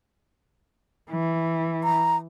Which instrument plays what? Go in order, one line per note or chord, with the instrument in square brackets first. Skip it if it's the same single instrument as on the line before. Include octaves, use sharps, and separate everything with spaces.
[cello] E3
[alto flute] A#5